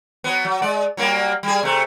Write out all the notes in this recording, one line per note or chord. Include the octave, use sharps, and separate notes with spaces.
F#3 B3
F#3
G#3 D5
F#3 G3 A#3
G3 G#4
C3 A3